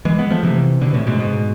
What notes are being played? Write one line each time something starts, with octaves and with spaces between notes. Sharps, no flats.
E3 G#3
G#3 B3
F3 A3
C3 E3
B2 D3
A2 C3
G#2 B2
G#2 B2